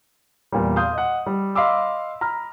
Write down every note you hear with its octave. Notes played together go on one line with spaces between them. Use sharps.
E2 A#2 G3
F5 C6 D#6 G6
D#5 F#5
G3
D#5 F5 B5 C6 D6 E6
A#5 B5 F6